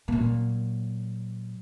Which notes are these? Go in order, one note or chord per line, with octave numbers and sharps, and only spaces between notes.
A#2 F#3